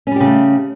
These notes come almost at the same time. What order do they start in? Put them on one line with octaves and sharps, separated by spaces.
C#4 G3 G4 C#3 A3